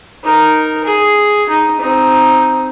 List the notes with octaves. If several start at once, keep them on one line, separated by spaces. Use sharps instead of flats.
D#4 A#4
G#4
D#4
C4 D#4